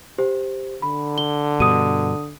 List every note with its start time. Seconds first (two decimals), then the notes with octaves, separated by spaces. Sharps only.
0.18 G4 C5
0.82 D3 B5
1.18 G7
1.60 G2 B2 D#6 D#7